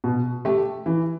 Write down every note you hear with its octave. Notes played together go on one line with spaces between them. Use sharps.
B2
A3 G4
E3